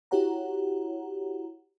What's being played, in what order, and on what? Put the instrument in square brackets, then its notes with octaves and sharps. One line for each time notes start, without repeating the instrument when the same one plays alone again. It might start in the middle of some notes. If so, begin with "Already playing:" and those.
[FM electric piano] E4 F#4 G4 C#5 F#5 A#5